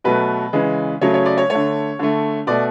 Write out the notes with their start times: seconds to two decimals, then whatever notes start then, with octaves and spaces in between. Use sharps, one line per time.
0.04 B2 F#3 A3 B4
0.53 C#3 E3 G#3
1.01 C#3 F#3 A3 C#5
1.14 C#5
1.26 D5
1.38 C#5
1.50 D3 A3 C#5
1.99 D3 A3
2.47 B2 A3 D5